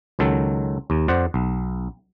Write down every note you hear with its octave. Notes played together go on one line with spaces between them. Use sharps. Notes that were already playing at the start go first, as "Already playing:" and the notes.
C#2 D#3 F#3 A4
D#2
F2 C5 D5 F#5
B1